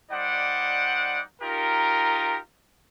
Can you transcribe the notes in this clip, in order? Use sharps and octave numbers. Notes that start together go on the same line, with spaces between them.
G3 D#4 C5 D5 F#5 D6
D#4 F4 G4 A#4